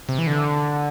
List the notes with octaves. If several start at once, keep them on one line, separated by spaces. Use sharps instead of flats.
C3
E3
D3